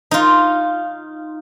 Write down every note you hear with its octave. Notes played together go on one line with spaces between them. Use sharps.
D#4 F4